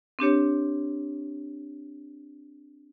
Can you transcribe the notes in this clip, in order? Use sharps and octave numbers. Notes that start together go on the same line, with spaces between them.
C4 D4 G4 C#5